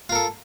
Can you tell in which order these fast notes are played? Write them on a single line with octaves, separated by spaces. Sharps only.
F4 A#4 A4